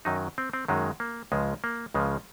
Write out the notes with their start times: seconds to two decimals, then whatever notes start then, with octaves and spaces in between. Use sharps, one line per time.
0.05 F#2 D#3 F#3 D#4
0.38 C4
0.53 C4
0.68 F#2 D#3 F#3 G#3
1.00 A#3
1.32 C#2 C#3 F3 G#3
1.64 A#3
1.94 C#2 C#3 F3 G#3